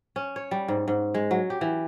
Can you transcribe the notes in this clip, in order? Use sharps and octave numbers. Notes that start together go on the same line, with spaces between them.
C#4
C#5
G3
G#2
G#2
G#3
F#3
G4
E3